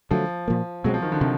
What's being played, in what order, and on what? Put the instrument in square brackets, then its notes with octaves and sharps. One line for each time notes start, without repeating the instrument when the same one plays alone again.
[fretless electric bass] D3 F#3 A3 [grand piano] F3
[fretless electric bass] A#2 F3 A#3
[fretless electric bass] B2 G#3 C4 [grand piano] F#3
[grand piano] F3
D#3
D3
[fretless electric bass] C3 [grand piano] D#3